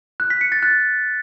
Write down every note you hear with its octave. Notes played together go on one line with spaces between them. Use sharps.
F#6
B6
C#7
A6
F#6